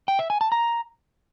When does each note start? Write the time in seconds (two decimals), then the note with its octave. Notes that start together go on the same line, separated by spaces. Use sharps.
0.08 G5
0.19 E5
0.30 G#5
0.41 A5
0.52 A#5